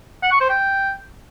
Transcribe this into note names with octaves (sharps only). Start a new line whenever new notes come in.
F#5
C#6
C5
G5